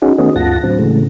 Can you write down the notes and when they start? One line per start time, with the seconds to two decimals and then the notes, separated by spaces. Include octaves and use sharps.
0.02 C#4 D#4 F#4 G#4
0.18 D#3 A3 B3 C#4 F#4 D#5
0.36 D2 G2 F4 F#5 A5 A#6
0.63 A2 D3 F#3 C4
0.79 A2 C#3 E3 G#3 A3